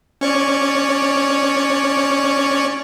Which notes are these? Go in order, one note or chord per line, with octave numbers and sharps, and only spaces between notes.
C#4 C#5 D5